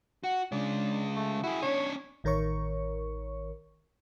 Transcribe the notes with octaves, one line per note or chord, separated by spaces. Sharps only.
F#4 F#5
C#3 G#3 D4
A3
E4 F#4 G#4
C#4 D4 C#5
A1 D#3 A#4 C#5 C#6